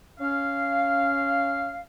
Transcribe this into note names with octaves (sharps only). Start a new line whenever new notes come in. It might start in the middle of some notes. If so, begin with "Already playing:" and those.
C#4 F5